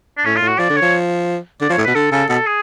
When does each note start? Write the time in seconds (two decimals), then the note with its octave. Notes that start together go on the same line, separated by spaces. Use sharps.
0.17 D4
0.25 A2 C#4
0.36 F4
0.41 A2
0.48 F#4
0.58 F3 D5
0.70 D3
0.76 C#5
0.82 F3
1.61 D3 D5
1.69 F3
1.72 C#5
1.78 A2
1.84 B2 B4
1.95 D3 A4
2.11 C#3 A4
2.29 B2 A4
2.46 G#4